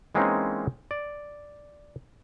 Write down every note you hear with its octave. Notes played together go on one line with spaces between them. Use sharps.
E3 G#3 A#3 C4 C#4 D#4
D5